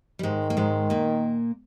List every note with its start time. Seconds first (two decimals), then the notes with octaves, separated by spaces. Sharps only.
0.19 G3
0.23 G#2 D#3 G#3
0.50 A#3
0.57 G#2 G#3
0.90 A#2 A#3